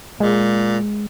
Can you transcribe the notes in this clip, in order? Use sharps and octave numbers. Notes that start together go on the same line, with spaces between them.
A#2 G#3